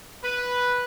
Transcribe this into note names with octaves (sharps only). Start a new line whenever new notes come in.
B4